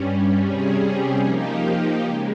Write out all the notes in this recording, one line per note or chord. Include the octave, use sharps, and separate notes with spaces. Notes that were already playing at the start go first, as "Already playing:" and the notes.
Already playing: G2 G3 C#4
C3 G3 C#4 G#4
F3 A#3 D#4 G4
C#3 G#3